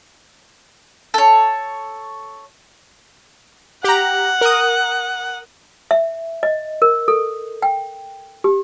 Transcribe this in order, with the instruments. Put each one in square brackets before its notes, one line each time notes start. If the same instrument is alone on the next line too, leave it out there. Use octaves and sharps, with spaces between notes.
[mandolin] A4 C#5
[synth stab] G4 A#5 [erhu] F#5
[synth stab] A#4 D#6
[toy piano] E5
D#5
A#4
A4
G5
G4